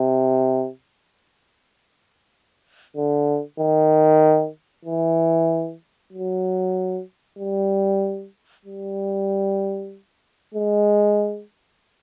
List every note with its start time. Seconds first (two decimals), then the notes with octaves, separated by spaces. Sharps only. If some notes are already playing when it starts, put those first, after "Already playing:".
Already playing: C3
2.97 D3
3.60 D#3
4.85 E3
6.13 F#3
7.38 G3
8.65 G3
10.54 G#3